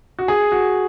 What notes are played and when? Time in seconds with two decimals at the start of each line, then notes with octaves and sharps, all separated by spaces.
0.19 F#4
0.28 G#4
0.52 F#4